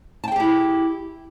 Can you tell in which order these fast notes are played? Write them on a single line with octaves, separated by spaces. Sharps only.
A5 G5 G#4 G4 E4